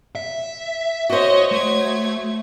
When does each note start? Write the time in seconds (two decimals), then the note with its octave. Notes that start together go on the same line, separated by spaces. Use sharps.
0.15 E5
1.10 F#4 C5 C#5 D#5
1.52 A3 G#6